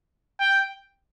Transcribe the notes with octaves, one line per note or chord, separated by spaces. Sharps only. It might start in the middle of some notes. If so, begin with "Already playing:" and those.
G5